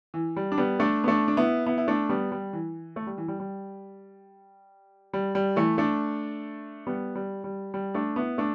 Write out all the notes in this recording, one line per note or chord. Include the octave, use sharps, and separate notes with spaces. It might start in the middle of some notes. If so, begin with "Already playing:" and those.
E3
G3
D4
G3 B3
A3 D4
B3
A3 D4
D4
B3 E4
B3 E4
E4
A3 D4
G3 B3
G3
E3
A3
G3
E3
G3
G3
G3
G3
E3 A3
A3 D4
G3 B3
G3
G3
G3
A3 D4
B3 E4
A3 D4